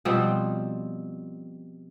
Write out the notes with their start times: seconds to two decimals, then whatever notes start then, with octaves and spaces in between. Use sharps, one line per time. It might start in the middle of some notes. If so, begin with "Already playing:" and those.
0.05 B2 F3 G3 C4